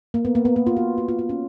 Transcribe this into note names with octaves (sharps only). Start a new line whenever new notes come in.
A#3
B3
A#3
B3
A#3
F4
F#4
F#4
F4
F4
C#4